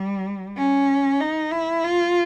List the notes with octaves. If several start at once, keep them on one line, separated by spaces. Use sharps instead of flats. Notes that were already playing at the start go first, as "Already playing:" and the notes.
Already playing: G3
C#4
D#4
E4
F4